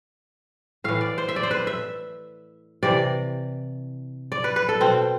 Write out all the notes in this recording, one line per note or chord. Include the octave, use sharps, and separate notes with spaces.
A2 E3 F5
D5
C5
E5
D5
C5
B4
E5
C3 E3 D5
D5
B4
B4
A4
B2 C4